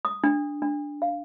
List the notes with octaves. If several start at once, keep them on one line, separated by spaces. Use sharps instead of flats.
D#6
D4
D4
F5